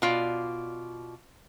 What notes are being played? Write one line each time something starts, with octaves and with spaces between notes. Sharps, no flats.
B2 F4 D5